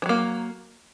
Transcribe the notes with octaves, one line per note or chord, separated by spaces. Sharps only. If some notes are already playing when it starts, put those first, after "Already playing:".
E3 F#3 A#3